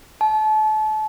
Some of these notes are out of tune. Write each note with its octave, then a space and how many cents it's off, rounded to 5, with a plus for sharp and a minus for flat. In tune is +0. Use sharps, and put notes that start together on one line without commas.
A5 -35